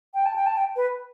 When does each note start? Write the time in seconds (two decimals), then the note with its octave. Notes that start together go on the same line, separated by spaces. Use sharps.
0.14 G5
0.26 A5
0.36 G5
0.46 A5
0.57 G5
0.76 B4